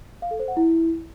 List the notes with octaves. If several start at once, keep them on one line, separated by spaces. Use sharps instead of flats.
F5
A4
C5
F#5
E4